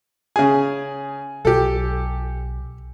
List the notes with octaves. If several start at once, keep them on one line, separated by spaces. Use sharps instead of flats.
C#3 G#4 G#5
B1 G4 A4